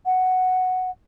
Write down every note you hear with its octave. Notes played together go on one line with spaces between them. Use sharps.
F#5